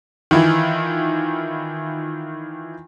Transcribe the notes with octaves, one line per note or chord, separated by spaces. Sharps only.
D#3 E3 E4 F4